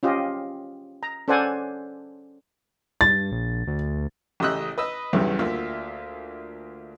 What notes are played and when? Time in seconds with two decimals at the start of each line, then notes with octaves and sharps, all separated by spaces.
0.03 C#4 F4 G4 D#5
1.03 A#5
1.28 C#4 A4 C5 D5 F#5 G#5
3.01 G2 A6
3.32 A#1
3.67 D2
4.40 A1 C#3 G4 D#5 E6 F#6
4.78 B4 D#5 E6
5.13 B1 E2 G2 C#3 E3 G3
5.39 D2 A#3 F4 E5